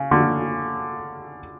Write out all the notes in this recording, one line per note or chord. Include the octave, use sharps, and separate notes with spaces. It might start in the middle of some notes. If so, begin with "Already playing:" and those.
Already playing: C#3
D3